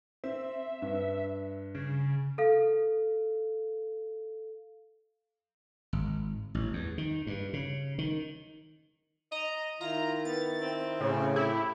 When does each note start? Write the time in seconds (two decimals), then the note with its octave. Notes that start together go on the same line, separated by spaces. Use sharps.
0.24 C4 E5
0.82 G2
1.75 C#3
2.38 A4 F5
5.93 G#1
6.55 A1
6.73 E2
6.98 D#3
7.27 G2
7.53 C#3
7.98 D#3
9.32 D#5 A#5
9.81 D#3 E4 F4 A#5
10.25 B3 A6
10.61 C4
11.00 A2 C#3
11.36 E4 G4